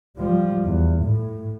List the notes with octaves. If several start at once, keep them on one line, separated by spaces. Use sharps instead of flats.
F3 G3
E2
A2